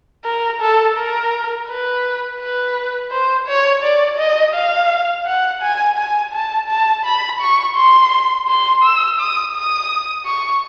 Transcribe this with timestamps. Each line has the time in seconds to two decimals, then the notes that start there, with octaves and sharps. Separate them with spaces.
0.25 A#4
0.61 A4
0.97 A#4
1.68 B4
2.40 B4
3.11 C5
3.47 C#5
3.83 D5
4.18 D#5
4.54 F5
5.26 F#5
5.62 G#5
5.97 G#5
6.33 A5
6.69 A5
7.05 B5
7.40 C#6
7.76 C6
8.48 C6
8.83 E6
9.19 D#6
9.55 D#6
10.26 C#6